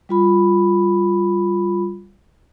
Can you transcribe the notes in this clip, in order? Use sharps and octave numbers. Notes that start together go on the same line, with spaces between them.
G3 F4 B5